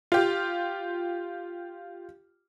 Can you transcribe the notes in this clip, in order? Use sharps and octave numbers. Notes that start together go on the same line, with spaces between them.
F4 G4